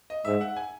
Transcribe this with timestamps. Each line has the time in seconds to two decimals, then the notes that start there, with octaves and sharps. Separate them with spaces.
0.10 D#5
0.25 G#2 E5
0.41 F#5
0.57 G#5